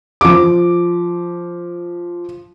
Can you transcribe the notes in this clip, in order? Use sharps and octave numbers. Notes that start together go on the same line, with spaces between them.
F3 D6